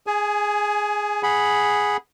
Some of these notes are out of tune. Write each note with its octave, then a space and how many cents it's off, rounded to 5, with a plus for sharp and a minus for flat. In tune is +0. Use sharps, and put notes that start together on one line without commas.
G#4 -5 G#5 +25
G#4 +0 F#5 +0 B5 +0